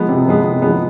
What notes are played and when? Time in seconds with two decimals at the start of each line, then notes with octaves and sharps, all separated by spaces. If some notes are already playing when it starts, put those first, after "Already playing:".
Already playing: F3 G#3 B3
0.09 C3
0.27 F3 G#3 B3
0.45 C3
0.62 F3 G#3 B3